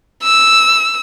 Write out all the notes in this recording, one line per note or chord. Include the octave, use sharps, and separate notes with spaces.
E6